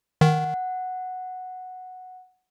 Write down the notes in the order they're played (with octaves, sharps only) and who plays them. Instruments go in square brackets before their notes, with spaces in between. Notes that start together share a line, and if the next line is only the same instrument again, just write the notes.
[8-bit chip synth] D#3 [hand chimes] F#5